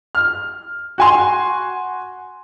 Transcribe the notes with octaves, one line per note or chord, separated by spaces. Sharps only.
F6
F#4 G#5 C6